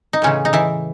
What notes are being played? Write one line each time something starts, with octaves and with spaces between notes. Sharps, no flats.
D#4
A2 C#3 E3 G#3 C#4
D#4
E3 E4